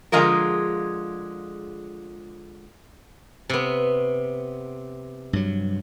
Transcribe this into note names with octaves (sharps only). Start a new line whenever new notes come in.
D3 F3 G#3 F4 G#4 A#4
C3 B3
G2 F#3